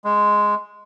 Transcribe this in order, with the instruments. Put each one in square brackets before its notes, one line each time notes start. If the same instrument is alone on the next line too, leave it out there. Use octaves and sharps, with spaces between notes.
[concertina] G#3